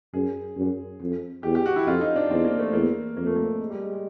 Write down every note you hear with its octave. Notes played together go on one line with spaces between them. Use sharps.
F#2 G#4
F#2
F2
E2 G4
G4
F#4
E4
F2 F4
D#4
D4
E2 C4
A#3
A3
E2 A#3
F2 A#3
A3
A#3
G#3
G3
G#3
G#3